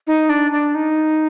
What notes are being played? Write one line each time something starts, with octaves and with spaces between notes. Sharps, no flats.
D#4
D4
D4
D#4